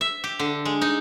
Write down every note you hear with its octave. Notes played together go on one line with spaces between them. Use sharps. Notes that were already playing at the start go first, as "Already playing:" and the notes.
E5
G4
D3
G#3
D#4